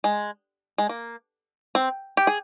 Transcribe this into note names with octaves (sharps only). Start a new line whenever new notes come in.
G#3
G#3
A#3
C4
G4
G#4